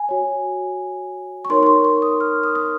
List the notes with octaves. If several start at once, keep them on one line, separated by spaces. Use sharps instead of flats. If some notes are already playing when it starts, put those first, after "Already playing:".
Already playing: G#5
F#4 C#5
C#6
D#4 A#4 C#5 C6
C6
C#6
C#6
D#6
F6
D#6
D#6